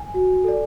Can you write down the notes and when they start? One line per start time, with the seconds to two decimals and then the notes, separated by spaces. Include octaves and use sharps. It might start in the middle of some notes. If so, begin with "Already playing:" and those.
Already playing: G#5
0.14 F#4
0.44 A4 D5